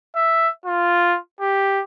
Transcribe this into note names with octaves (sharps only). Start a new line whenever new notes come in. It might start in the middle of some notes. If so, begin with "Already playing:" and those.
E5
F4
G4